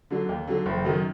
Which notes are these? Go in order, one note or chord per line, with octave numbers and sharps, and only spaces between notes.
D3 F#3
D#2
D3 F#3
F#1
F#2 D#3 F#3